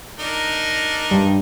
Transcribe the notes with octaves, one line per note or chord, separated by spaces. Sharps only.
D4 D#4 A#4
G2